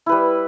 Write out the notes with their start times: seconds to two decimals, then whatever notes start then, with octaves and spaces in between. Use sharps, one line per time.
0.06 E4
0.09 B4
0.12 G3